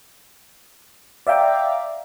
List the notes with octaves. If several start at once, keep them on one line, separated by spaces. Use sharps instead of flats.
D5 E5 F5 G5 A#5 D6